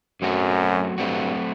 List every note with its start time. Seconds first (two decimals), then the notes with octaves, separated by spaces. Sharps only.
0.22 F#2 F#3 A3 C4 F#4
0.98 G2 F#3 A3 C4 F#4